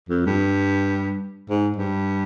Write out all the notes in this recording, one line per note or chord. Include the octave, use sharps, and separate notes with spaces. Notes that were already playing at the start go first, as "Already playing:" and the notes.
F2
G2
G#2
G2